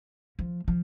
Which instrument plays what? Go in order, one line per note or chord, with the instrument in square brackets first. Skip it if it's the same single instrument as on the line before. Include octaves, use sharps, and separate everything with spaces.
[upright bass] F3
F3